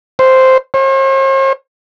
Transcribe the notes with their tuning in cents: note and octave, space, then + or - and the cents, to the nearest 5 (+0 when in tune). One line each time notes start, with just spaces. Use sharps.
C5 -5
C5 +45